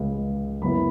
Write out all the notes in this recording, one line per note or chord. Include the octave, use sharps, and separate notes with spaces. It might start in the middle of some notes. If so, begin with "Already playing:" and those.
Already playing: C#2 C#3 G#3
F#1 F#2 F#3 B3 E4 B5